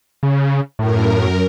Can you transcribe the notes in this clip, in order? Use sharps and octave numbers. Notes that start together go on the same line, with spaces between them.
C#3
F#2 A2 A#4